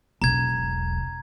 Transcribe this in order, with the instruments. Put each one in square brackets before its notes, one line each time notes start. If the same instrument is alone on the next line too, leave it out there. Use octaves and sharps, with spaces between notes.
[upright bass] E1 B1 [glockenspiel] A#5 G#6